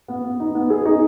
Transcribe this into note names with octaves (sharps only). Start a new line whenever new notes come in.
B3
B3
D#4
B3
G#4
D#4